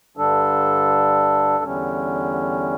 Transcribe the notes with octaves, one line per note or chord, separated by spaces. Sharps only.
G2 D3 G3 D4 A4
E2 D3 G3 C#4